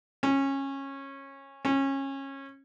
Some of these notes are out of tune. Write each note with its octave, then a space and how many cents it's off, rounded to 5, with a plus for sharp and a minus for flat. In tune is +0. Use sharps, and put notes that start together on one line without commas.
C#4 -20
C#4 -25